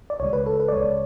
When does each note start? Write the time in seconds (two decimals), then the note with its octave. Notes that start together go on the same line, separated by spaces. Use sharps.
0.10 D5
0.20 C#2 C#3 G#3 C#5
0.33 B4
0.46 A4
0.60 B4
0.68 D5
0.72 C#2 C#3 G#3 C#5